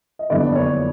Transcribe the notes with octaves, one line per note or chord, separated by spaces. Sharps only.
D#5
F#1 F2 D3 G3 B3 D5
C#5